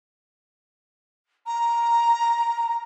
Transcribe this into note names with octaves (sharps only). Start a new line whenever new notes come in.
A#5